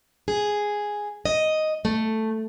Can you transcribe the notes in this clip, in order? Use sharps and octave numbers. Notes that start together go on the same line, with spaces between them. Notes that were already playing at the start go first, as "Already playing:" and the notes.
G#4
D#5
A3